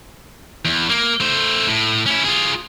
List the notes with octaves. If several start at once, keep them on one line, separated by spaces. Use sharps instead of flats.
E2
A#3
A3 C5
A2
C#4 E4
F4 G#4